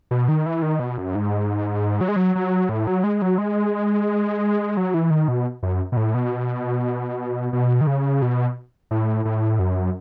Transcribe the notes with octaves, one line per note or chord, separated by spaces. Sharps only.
B2
D#3
E3
D#3
B2
F#2
G#2
F#3
G#3
F#3
F#3
A2
F#3
G#3
F#3
G#3
F#3
E3
D#3
B2
F#2
B2
A2
B2
B2
D#3
C#3
B2
A2
A2
F#2